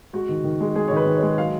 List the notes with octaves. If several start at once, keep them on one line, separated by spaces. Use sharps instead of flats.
G#3 F#4
D#3
D#3
G#3
G#3 G#4
D#3 C#5
B4
D#3
C#5
G#3
F#3 F5